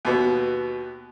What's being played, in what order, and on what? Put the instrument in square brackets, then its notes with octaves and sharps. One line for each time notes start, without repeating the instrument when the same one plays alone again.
[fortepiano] D#2 B2 B3